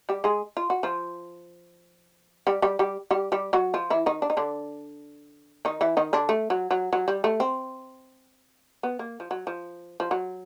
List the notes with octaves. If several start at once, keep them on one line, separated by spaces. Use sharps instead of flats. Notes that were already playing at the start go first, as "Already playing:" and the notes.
G3 G4
G#3 G#4
F4
F#4
F3 F4
G3 G4
G3 G4
G3 G4
G3 G4
G3 G4
F#3 F#4
F3 F4
E3 E4
D#3 D#4
D4
D#4
D3 D4
D#3 D#4
E3 E4
D#3 D#4
D3 D4
A3
F#3
F#3
F#3
G3
A3
C4
B3
A#3
F3
F#3
F3
F3
F#3